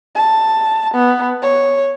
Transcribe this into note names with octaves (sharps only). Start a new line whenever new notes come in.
A5
B3
C#5